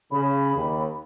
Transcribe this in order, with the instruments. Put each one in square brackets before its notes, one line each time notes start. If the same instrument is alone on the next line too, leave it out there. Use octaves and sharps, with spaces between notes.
[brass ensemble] C#3 [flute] B5
[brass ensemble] D#2